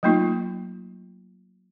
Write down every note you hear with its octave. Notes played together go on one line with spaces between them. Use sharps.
F#3 A3 A#3 D#4 F4